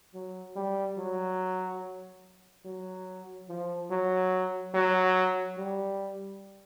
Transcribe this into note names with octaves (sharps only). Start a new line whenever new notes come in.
F#3
G3
F#3
F#3
F3
F#3
F#3
G3